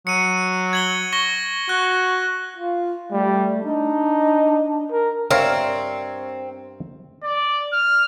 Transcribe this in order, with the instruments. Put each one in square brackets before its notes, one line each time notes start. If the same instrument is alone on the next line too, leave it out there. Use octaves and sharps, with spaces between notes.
[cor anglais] F#3 [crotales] C#7 D#7
[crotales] G#6 F#7 G7
C#6 A#6 G7
[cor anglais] F#4 [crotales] F#6
[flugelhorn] F4
[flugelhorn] G3 [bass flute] A3
[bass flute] D4 [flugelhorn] D#4
[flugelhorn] A#4
[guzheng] G2 [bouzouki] C4 [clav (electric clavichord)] A#4 E5 F5 [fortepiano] C#5
[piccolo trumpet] D5
F6